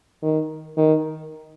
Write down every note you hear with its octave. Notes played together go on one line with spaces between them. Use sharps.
D#3
D#3